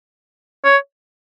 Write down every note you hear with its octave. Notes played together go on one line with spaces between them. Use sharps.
C#5